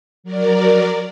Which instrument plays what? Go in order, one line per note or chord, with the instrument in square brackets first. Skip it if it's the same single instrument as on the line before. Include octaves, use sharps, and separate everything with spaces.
[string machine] F#3 A#4 D5